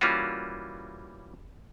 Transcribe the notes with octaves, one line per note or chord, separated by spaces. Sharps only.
E3 G3 A#3 C#4 F4 F#4